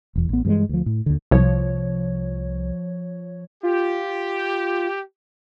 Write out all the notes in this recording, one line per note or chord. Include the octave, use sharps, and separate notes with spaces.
E1 E2
A1 B3
G2 E3 G3 G#3
D2 F3
A2
D#2 D3
C2 F3 C#5
F4 G4